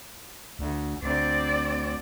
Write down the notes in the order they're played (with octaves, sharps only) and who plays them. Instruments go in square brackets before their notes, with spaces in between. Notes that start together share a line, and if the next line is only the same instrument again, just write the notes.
[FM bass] D2
[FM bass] D2 [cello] C4 D5